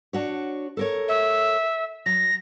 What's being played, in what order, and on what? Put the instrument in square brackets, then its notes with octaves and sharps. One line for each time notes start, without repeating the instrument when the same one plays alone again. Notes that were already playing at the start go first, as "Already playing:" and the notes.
[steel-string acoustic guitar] D4 F#4 C#5
A4 A#4 C#5
[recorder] E5
[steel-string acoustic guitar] F#3 [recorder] A#6